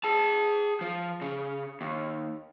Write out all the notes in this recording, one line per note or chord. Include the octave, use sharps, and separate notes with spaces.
G#4 A5
F3
C#3
D#2